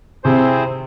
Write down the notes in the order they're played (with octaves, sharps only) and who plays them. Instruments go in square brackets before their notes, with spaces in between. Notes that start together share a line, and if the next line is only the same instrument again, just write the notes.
[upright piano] C3 [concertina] C4 E4 G#4 C5